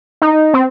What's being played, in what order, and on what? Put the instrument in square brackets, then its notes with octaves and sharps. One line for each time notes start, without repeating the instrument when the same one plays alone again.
[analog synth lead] D#4
C4